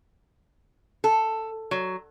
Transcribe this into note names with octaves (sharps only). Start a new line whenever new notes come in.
A4
F#3